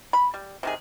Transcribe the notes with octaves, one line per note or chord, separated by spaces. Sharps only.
B5
G3
C3 D#3 G#4